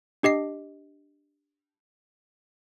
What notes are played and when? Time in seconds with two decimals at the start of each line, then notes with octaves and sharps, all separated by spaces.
0.23 D4 G4 D#5 C7